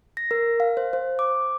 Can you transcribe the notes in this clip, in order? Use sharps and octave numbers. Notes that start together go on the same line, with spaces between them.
A#6
A#4
F5
C5
C5
D6